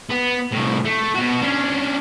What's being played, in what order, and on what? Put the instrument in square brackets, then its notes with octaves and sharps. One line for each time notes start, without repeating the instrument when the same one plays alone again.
[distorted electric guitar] B3
C2 A2
A3
B2 F#4
C#4 D4